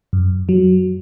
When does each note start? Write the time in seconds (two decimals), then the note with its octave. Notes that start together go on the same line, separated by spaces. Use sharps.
0.13 F#2
0.49 F#3